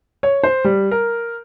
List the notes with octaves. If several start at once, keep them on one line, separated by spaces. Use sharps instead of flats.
C#5
C5
G3
A#4